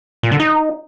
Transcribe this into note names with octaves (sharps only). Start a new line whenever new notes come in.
A#2
D3
D#4